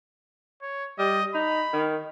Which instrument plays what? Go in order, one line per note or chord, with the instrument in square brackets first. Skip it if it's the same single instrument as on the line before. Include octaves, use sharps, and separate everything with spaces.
[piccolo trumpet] C#5
[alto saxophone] G3 [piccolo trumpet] D#5
[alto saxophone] D#4 [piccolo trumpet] B5
[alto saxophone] D#3